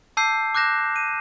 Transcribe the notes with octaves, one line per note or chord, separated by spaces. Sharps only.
A5 D6 E6 G6 C7
D6 F#6 G6 A#6 E7
D#7